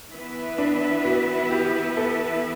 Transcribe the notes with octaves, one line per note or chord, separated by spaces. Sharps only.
E3 B3 E4 B4 E5
D4
F#4
G4
A4